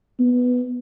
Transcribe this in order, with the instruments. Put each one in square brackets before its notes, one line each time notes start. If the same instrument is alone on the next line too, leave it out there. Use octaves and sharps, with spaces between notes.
[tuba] B3